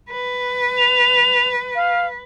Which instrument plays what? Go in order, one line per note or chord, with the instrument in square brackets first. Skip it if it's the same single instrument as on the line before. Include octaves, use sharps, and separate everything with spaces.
[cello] B4
[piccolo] F7
F5